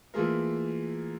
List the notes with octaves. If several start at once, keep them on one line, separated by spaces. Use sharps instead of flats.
E3 A3 A#3 F4 G#4 A#4